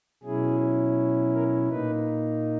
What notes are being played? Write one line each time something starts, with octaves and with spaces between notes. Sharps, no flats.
B2 F#3 C#4 E4 G#4
A#4
A#2 A#3 D#4 B4